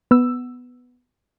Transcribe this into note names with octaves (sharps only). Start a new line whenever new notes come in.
B3 E6